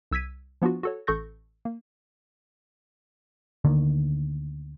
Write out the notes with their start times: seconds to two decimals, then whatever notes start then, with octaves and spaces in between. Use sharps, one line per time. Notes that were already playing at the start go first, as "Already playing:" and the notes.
0.11 C2 E6 G#6 B6 D#7
0.62 F3 B3 D4 F4 F#4
0.83 F#4 A4 C#5
1.07 A1 A4 C#6 G6 A#6
1.65 A#3
3.65 D2 D3 D#3 A#3